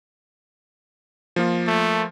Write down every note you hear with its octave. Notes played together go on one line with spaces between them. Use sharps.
F3 A#3 F4
A3